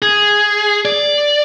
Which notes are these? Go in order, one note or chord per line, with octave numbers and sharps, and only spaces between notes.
G#4
D5